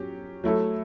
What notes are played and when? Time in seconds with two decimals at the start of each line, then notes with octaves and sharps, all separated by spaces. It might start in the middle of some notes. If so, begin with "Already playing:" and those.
Already playing: F#3 C#4 G4
0.44 F#3 A3 E4 A4